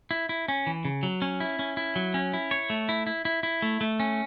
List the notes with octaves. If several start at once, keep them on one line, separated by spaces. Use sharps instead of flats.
E4
E4
C#4
E3
C#3
F#3
C#4
E4
C#4
E4
F#3
C#4
E4
C#5
A3
E4
E4
E4
E4
A3
A3
C#4